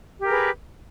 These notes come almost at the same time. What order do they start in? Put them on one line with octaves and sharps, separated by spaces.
G4 A#4 G#4 B4